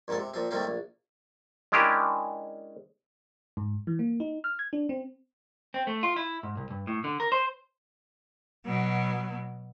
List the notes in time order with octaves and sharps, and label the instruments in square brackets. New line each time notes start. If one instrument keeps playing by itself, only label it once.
[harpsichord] A#1 G#2 D#3 G#3 A4
C3
A#2 F3 C4
A2 C3 D#3 G3 A#3 C4
A#1
[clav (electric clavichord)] G#3 C#4 D4 E4 G4 A#4
[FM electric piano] G#2
E3
A#3
D#4
F6
G#6
D4
C4
[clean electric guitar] C4
A3
F4
E4
G#2
C2
G2
A2
D3
A#4
C5
[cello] B2 F#3